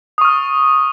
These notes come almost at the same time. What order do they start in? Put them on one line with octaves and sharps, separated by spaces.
D#6 C#6 F6